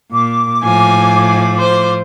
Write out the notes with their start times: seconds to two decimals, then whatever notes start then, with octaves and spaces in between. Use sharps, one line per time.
0.12 A#2 D6
0.63 A2 F3 G#5
1.59 C5